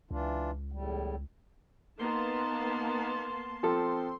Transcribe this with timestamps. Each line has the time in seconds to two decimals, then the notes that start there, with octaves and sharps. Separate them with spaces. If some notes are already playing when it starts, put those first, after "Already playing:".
0.11 C#2 E3 D4 F4
0.72 E2 A2 G3
1.99 A#3 B3 D#4 A5 C6
3.63 F3 C4 A4